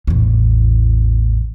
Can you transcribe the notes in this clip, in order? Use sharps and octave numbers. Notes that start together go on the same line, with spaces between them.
A1 E2